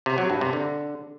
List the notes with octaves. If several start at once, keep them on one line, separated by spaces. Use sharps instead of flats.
C3
F#3
G2
C3
D3